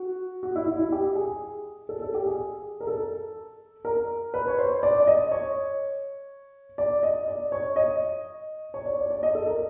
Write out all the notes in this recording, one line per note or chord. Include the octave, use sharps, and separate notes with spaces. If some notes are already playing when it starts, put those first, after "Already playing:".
Already playing: F#4
F#4
E4
E4
E4
G4
G#4
A4
A4
G4
G#4
A#4
A4
A#4
B4
C#5
C5
D5
D5
D#5
C#5
D5
D#5
D5
C#5
D#5
C#5
D5
D5
D5
D#5
A4
A#4